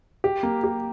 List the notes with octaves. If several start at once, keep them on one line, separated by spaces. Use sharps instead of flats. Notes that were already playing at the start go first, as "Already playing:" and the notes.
G4
A#3
G4